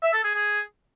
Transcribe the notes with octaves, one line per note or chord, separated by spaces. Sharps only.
E5
A4
G#4
G#4